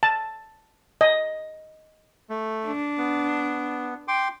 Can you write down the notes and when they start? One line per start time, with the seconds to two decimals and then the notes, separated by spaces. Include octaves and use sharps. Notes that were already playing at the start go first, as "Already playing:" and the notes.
0.03 A5
1.01 D#5
2.30 A3
2.67 D4
2.98 B3
4.08 G5 C6 D6